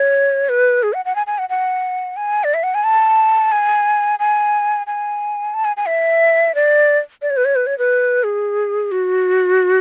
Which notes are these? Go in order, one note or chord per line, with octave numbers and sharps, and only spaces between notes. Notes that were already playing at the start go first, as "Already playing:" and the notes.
Already playing: C#5
B4
G#4
F#5
F#5
G#5
G#5
F#5
F#5
G#5
D5
E5
F#5
G#5
A5
G#5
G#5
G#5
A5
G#5
G#5
E5
D5
D5
C#5
B4
C#5
B4
C#5
B4
G#4
F#4